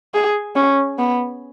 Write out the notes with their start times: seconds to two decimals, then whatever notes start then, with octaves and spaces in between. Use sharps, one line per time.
0.14 G#4
0.56 C#4
0.99 B3